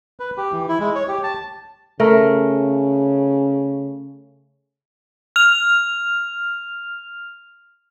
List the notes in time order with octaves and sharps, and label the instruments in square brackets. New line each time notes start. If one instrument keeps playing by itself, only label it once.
[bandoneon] B4
G4
E3
E4
G#3
C#5
G4
A5
[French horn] C#3 [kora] A3 A#4
[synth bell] F6 F7